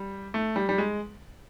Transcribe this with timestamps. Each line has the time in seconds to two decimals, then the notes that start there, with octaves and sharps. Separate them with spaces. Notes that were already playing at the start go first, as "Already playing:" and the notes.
Already playing: G3
0.34 A3
0.56 G3
0.69 G3
0.78 G#3